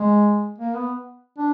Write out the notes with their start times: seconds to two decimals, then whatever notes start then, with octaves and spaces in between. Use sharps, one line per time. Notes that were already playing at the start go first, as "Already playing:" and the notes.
Already playing: G#3
0.59 A#3
0.75 B3
1.38 D4